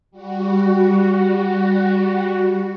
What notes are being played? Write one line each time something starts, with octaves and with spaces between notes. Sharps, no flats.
G3 F#4